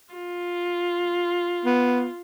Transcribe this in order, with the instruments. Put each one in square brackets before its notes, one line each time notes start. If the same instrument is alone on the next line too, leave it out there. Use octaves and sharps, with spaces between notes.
[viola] F4
[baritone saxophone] B3